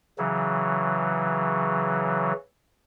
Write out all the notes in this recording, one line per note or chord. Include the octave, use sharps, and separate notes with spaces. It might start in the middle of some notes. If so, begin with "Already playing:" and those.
C#3 E3 F#3